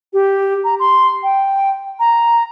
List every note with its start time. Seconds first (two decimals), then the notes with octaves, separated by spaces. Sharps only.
0.13 G4
0.64 A#5
0.80 C6
1.23 G5
2.00 A#5